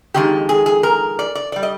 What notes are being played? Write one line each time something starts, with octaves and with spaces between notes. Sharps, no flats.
F2 D#3 G#3 G4
G#4
G#4
A#4
D5
D5
G3 D5
D#5